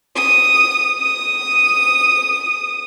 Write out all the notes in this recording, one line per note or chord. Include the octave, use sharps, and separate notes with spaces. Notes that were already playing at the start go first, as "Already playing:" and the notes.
D#6
D#6